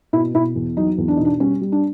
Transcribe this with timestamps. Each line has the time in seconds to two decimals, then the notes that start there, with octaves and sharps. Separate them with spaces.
0.13 B2 E4
0.34 B2 E4
0.56 E2
0.77 F#3 D#4
0.98 E2
1.08 D4
1.17 B2 D#4
1.25 D4
1.40 G3 C#4
1.61 G3
1.72 D4